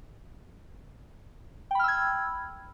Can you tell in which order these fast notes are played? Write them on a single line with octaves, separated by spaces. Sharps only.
G5 B5 F6 E6 G#6